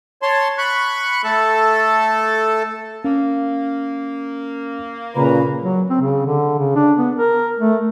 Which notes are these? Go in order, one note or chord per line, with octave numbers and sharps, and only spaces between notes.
C#5 A5 C6
B5 C#6 F#6
A3 A4 A5
A#3 C#4
A#2 C#3 B4 A#5
F#3
C4
C#3
D3
C#3
D4
B3
A#4
A3